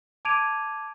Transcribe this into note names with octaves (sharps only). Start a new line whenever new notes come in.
A5 D6 G#6 D7 D#7 F7